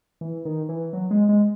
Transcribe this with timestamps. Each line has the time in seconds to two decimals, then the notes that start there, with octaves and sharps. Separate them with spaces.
0.21 E3
0.45 D#3
0.69 E3
0.93 F#3
1.11 G#3
1.29 G#3